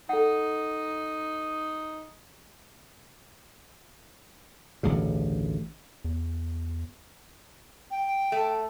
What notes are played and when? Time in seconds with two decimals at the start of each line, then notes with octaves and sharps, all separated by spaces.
0.09 D#4 A4 F#5
4.83 A1 D2 G2 C#3
6.05 E2
7.91 G5
8.32 A3